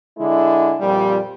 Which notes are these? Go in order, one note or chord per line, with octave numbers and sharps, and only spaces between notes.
D3 G#3 E4
F2 A#2 G3